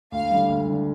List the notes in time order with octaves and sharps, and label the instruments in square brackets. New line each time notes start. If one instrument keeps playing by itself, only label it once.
[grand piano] D2 [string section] F5
[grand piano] D3 G3
D2
D3 G3